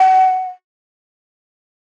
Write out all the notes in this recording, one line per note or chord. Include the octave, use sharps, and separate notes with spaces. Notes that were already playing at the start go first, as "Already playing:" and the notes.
Already playing: F#5